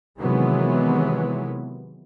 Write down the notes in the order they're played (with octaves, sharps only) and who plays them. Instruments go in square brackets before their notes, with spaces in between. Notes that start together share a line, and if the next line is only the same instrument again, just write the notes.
[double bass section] C3 D#3 E3 F#3 G#3 B3